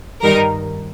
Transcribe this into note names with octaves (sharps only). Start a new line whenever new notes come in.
G2 D#3 G3 D#4 A#4